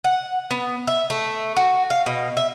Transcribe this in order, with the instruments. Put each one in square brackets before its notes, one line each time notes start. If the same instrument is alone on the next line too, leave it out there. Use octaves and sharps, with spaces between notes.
[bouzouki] F#5
B3
E5
A3
F#4
F5
B2
E5